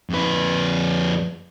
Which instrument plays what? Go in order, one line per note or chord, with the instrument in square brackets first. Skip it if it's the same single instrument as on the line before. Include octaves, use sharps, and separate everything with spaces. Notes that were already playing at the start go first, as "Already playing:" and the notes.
[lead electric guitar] F2 B4